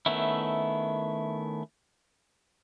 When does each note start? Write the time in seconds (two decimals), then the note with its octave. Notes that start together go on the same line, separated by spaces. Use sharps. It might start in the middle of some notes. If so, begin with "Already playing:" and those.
0.06 D#3 A3 B3 C#4 E4